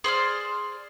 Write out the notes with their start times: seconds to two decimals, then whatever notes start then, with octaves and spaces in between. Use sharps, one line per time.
0.04 G#4 C5 D5 F6